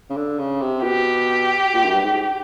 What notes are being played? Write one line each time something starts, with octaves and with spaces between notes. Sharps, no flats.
C#3
D3
C#3
C3
B2 G4
A#2
F#2
G2
G#2